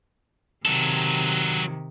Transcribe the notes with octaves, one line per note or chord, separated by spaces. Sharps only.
C3 D#3 F#3 A4